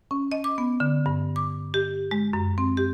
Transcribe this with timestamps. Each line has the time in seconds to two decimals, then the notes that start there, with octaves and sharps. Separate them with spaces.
0.11 C#4
0.32 D#5
0.44 D6
0.58 B3
0.80 D3
1.06 G2
1.36 D6
1.74 G4
2.11 G#3
2.33 F#2
2.58 C4
2.77 G4